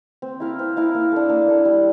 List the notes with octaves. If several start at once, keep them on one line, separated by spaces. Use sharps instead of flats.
C4
E4 A#4 F5
C4
E4 A#4 F5
A#3
D4 A4
A#3
D4 A4
G3